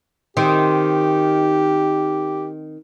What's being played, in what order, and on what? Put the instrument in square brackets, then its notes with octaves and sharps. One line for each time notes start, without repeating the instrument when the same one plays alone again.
[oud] D#3 C4 [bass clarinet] G4